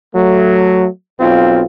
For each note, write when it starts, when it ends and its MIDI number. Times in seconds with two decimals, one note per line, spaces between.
0.14 0.86 54
0.14 0.86 57
1.19 1.62 35
1.19 1.62 60
1.19 1.62 65